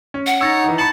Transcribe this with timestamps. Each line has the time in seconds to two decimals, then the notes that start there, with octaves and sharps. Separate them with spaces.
0.14 C#4
0.26 F#5
0.41 D#4 C#5 E6 A6 A#6
0.64 D#3 E3
0.78 A5 B5 C#7 F#7